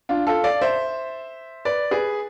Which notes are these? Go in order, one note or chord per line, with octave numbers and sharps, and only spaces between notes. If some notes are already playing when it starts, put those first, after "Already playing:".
D4 F4
F4 A4
D5 F5
C5 E5
B4 D5
G#4 B4